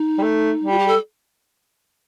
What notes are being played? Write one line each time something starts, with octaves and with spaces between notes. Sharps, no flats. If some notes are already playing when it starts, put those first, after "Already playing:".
Already playing: D#4
G3
A3
G3
F4
G4
A4